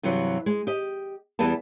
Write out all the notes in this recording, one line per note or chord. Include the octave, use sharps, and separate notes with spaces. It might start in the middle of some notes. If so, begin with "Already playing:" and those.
G2 C3 E3 F#3
G#3
G4 D#5
E2 E3 G3 B3 A5